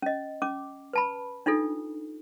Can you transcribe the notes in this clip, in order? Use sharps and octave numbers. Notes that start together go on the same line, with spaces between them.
C#4 D#5
C#4 D6
B4 A5 B5
D4 D#4 F4 A4